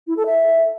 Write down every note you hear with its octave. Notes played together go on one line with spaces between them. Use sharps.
E4
A4
E5